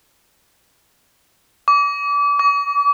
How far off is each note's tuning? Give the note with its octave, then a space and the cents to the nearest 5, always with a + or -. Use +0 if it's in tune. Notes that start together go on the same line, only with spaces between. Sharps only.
D6 -30
D6 -45